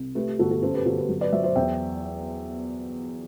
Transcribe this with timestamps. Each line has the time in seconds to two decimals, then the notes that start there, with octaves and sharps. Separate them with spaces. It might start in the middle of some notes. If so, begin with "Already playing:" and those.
Already playing: C2
0.15 A3 G4 B4
0.28 G4
0.39 G1 F#4 A4
0.51 F#4 A4
0.62 F#2 A4 C5
0.74 G4 B4
0.86 G1 F#4 A4
0.98 G4 B4
1.09 F#3
1.21 B4 D5
1.32 F#3 C5 E5
1.44 C5 E5
1.55 E2 E5 G5